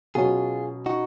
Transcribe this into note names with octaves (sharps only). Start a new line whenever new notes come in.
B2 F#3 C#4 F4 G#4
D#4 F#4